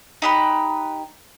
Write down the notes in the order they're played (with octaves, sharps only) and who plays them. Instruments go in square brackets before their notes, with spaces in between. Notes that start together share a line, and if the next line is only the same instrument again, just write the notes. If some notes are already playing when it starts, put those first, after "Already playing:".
[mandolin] D#4 G4 B4